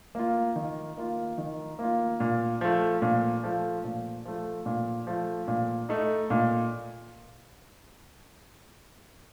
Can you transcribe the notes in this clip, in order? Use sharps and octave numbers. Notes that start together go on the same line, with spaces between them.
A#3 F4
D#3
A#3 F4
D#3
A#3 F4
A#2
F3 A3
A#2
F3 A3
A#2
F3 A3
A#2
F3 A3
A#2
A3 D#4
A#2